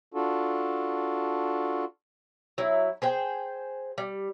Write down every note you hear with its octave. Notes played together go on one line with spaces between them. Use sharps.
D4 F4 F#4 A4
F#3 E4
G#4 C5 G5
G3